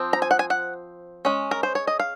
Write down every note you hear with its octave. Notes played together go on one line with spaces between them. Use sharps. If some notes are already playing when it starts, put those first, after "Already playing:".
Already playing: F3 C4
A#5
G#5
F#5
G#5
F#5
G#3 C#4
A#4
C5
C#5
D#5
F5